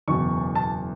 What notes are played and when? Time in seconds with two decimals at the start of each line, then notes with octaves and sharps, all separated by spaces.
0.08 F#1 E2 B2 C#6
0.55 A5